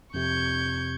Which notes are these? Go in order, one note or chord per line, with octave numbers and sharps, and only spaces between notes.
F2 C3 C#6 G6 G#6